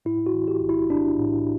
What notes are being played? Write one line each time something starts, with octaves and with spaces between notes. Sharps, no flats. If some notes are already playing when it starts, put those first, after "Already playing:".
A2 E4
F#4
E3
G4
B1
E4
B1 D4
A2